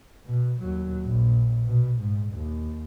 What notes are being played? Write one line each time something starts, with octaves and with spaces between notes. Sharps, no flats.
B2
D#2 F#3
A#1
B2
G#2
D#2